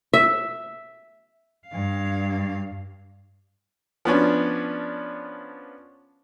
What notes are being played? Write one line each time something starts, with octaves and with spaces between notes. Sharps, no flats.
E5
G2 F5
F3 B3 C#4 D4